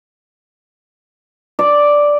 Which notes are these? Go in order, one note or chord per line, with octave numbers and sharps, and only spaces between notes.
D5